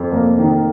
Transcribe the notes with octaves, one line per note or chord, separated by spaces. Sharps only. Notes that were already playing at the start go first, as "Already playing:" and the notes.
Already playing: F2
F1 A#3
D#3